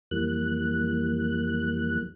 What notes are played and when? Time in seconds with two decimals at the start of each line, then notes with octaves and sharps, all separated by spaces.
0.11 F2 E3 G3 A#3 F#6